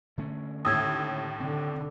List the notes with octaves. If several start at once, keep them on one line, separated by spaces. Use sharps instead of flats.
D3 A3 C#4
D#2 A2 D#6 E6 G#6
D3 C4